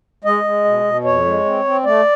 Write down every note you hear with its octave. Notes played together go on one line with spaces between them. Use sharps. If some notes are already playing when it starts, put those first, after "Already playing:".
G#3 D#5
G#3
B2
B2
F2 C#5
G#3
C4
C4
A3 D5